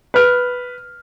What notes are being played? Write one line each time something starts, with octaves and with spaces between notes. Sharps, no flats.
B4 F6